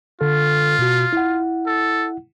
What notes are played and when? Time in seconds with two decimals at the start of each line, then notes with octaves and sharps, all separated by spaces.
0.21 D3 F4 A4
0.79 B2 F#4
1.13 E4 F#5
1.67 A4